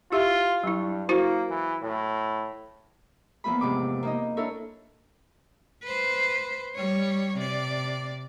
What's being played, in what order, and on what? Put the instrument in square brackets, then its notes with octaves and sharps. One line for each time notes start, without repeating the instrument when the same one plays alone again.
[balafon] E4 G4 E5 [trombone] F4
[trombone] G2 [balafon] F#3 E4
[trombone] A#3 [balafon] E4 F#4 C5
[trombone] E3
A2
[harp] E2 F3 A#3 F4 B5
G#2 C3 D6
A#3 D#4 D#5
D4 E4 A4 A#4 C#5
[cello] B4 C5
G3 C#5
C3 D5